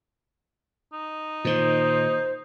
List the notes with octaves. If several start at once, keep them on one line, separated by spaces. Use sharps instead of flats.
D#4
A#2 D#3 C5